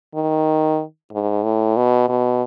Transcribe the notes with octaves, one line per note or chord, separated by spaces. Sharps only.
D#3
G#2
A2
B2
B2